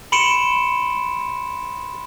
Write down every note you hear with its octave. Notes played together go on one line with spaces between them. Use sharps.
B5 C6 C#7 D7 E7